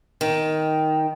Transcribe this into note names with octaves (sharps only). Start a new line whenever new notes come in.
D#3